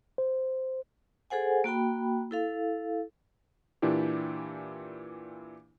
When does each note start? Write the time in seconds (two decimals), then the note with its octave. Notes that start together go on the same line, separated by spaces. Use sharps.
0.18 C5
1.30 G#4 A4 C5 F#5 G#5
1.64 A#3 F#4 G5 B5
2.31 E4 A4 F5
3.82 A#2 E3 D4 E4 G4